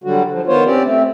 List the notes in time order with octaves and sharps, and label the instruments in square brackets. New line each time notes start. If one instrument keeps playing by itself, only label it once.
[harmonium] D3 F#3 G3 F#4
F3
D#3 B3 F4 C5 C#5
C4 C#4 G4 D5
A3 C4